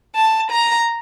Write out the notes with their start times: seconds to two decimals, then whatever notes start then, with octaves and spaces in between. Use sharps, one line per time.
0.15 A5
0.51 A#5